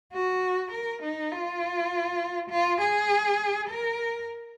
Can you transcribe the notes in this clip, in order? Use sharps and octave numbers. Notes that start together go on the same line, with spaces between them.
F#4
A#4
D#4
F4
F4
G#4
A#4